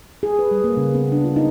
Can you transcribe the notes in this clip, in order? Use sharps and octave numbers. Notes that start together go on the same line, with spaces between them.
G#4
B4
G3
A#3
C#3
B3
D4
F4
D#4